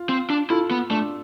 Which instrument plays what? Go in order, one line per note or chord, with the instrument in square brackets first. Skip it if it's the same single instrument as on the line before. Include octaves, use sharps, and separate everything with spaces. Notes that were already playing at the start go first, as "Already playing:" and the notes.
Already playing: [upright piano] F4
[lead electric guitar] C4
D4
[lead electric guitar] E4 [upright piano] F4 A4
[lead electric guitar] B3
[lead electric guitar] A3 [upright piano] D4